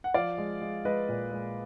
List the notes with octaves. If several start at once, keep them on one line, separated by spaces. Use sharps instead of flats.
F#5
F3 D5 F5
G#3
G#3
G#3 B4 D#5
A#2
G#3